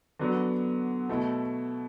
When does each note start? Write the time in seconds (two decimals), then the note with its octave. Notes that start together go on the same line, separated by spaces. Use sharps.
0.19 D3 F#3 B3 D4
1.09 B2 A3 E4